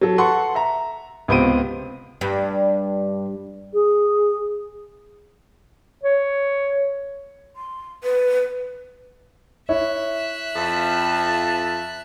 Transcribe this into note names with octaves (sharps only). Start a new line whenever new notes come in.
F#3 A4
A4 B4 F#5 C6 C#6
E5 A#5
C#2 C3 B3 C5 D7 D#7
G2
G#4
C#5
C6
B4
E4 C#5 E5 F#6
F2 A5